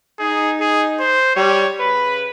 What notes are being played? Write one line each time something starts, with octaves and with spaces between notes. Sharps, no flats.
D#4 G#4
G#4
C5
G3 C#5
C#3 B4 B5